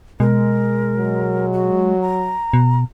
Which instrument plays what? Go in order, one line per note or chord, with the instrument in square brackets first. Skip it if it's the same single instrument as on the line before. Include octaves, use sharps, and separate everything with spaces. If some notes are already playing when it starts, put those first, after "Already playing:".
[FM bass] B2 [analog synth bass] G#3 [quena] A#4
[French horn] F#3
[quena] F#4
A#5
[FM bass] B2